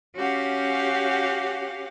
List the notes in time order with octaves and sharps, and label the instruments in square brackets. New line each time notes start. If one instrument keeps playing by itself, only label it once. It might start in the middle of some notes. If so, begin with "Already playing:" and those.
[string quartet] C#4 F#4 G4 F5 F#5